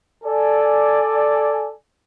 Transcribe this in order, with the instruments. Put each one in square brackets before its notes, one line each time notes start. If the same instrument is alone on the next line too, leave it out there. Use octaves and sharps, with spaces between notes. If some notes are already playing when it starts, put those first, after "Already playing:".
[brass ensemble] A4 D5 G#5